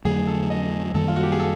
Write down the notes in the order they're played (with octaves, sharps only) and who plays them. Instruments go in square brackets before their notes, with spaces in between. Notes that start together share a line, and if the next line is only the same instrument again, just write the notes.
[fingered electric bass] F2 D3 F#3 A3 [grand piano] G#4
[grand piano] A4
D#5
[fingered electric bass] F#2 D#3 G3 A#3 [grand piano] A4
[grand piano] F4
F#4
G4
G#4
A4